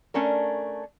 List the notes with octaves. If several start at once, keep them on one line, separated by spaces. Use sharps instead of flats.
A3 C#4 D4 A#4